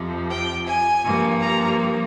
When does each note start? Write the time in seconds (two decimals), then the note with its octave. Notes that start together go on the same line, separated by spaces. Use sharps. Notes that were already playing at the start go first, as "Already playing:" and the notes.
Already playing: F2 C3 F3
0.29 G5
0.66 G#5
1.04 G2 F3 A#3
1.41 A#5